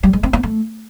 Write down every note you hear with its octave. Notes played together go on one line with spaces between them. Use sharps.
G3
G#3
C4
B3
A3